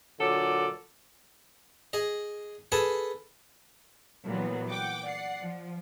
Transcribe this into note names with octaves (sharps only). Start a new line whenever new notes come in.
A#2 D3 F#3 A4 D5
G#4 D#5
G#4 A4 B4 G#5 A5
A#2 E3 F#3 G3 B3
F#5 G5 D6
D5 F#5 C7
F3